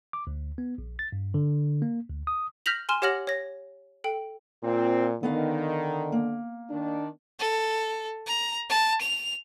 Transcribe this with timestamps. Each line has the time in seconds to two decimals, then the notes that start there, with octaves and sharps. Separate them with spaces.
0.13 D6
0.27 D2
0.58 B3
0.78 A#1
0.99 A6
1.12 G2
1.34 D3
1.82 A#3
2.09 D2
2.27 D#6
2.66 F6 G6 A#6 B6 F7 F#7
2.89 G#5 C6 F6 E7
3.02 G4 C#5 F#5 F6 A#6 F#7
3.27 C#5 A#6
4.04 A4 G5
4.63 A#2 C4 F4
5.23 D3 D#3 B3 D#5 F5
6.12 A#3
6.70 D#3 D4
7.39 A4
8.27 A#5
8.69 A5
9.01 F7